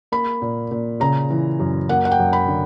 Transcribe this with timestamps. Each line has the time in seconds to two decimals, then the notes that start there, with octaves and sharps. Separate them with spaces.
0.12 A#3 B5
0.42 A#2
0.71 A#2
1.00 C#3 A#5
1.30 E3
1.60 F#2
1.89 A#3 F#5
2.05 F#5
2.11 G5
2.19 F#2
2.33 B5
2.48 D3